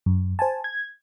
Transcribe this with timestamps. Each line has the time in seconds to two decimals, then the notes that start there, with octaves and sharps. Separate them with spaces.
0.06 F#2
0.39 C5 G#5 A5
0.64 G#6